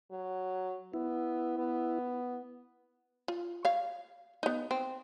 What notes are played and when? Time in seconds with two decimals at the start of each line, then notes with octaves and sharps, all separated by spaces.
0.12 F#3
0.94 B3 E4
1.58 B3
3.28 F4
3.65 C#5 F5
4.43 B3 D#4
4.71 C4